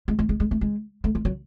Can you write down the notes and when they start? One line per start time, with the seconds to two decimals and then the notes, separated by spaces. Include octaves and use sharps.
0.08 G#3
0.19 G#3
0.29 G#3
0.40 G#3
0.51 A3
0.61 G#3
1.04 A3
1.15 G#3
1.25 F#3